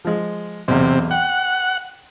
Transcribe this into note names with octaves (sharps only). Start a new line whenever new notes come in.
F3 G#3
B1 E2 C3
F#5 G5